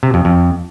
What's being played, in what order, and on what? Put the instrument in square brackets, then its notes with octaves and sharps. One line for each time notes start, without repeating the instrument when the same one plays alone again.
[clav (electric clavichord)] C3
F2
F2